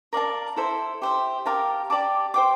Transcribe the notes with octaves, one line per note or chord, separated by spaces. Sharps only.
A#4 D5 F5 A5
E4 A4 C5 E5
G4 C5 E5
G4 A#4 F5 A5
G4 D5 A5 D6
C5 G5 D6